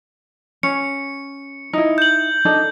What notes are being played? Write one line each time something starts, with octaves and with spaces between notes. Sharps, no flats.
C#4 C#7
D#4 E4
G6 F#7
D4 D#4 A4